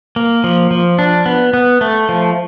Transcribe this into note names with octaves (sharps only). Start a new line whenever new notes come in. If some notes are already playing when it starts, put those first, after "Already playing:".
A#3
F3
F3
D4
B3
B3
A3
F3